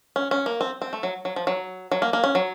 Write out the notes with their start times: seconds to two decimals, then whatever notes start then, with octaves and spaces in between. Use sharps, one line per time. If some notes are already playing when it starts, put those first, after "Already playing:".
0.16 C#4
0.31 C#4
0.46 A#3
0.61 C4
0.82 C4
0.93 A3
1.03 F#3
1.25 F#3
1.36 F3
1.47 F#3
1.91 F#3
2.02 A#3
2.13 A#3
2.24 C#4
2.35 F#3